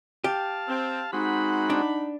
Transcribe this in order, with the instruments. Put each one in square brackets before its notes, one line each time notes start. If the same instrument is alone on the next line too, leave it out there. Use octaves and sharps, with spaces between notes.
[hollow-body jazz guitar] G4 [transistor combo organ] F5 A5
[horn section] C4
[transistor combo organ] G#3 C4 F#4 [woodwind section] D#4 [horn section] F#5 B5
[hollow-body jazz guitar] D4